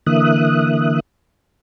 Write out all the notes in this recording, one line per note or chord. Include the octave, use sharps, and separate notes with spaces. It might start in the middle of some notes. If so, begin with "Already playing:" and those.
D3 E3 A#3 E5 D#6 F#6